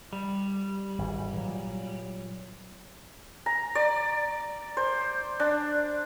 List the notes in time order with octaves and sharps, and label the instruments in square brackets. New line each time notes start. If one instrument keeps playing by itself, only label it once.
[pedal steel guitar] G3
[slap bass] G#1 E3
A#2 F#3
[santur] A#5
D5
C5
D4